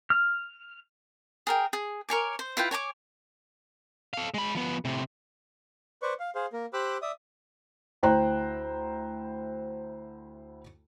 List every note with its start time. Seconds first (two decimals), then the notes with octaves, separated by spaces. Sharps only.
0.10 F6
1.47 G#4 A#4 G5
1.73 G#4
2.09 A#4 C#5 G#5 D6
2.39 C5
2.57 E4 F4 B4 G5
2.71 C#5 G#5 A#5 D6
4.14 A4 F5
4.34 G#3 B5
4.55 F3 B3
4.85 A2 C3
6.02 B4 C5 D5 C#6
6.20 F5
6.35 G#4 C5 F5
6.53 A#3 A#4
6.73 G4 C5 B5 D6 E6 F#6
7.02 D5 E5 D#6
8.03 D2 E4 C5 G5 A#5 F#6